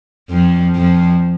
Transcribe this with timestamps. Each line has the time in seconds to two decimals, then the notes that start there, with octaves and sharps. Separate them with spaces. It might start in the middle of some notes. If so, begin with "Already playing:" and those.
0.30 F2 F3
0.75 F2 F3